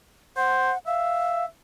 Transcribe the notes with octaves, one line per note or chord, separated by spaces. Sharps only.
C5 F#5
E5 F5